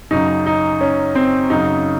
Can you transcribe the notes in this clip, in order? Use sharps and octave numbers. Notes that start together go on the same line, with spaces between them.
F#2 C#3 D#4
D#4
C#4
C4
F#2 C#3 D#4